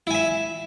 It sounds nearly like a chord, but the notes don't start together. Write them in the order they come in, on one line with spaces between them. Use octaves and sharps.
E4 G#5 E5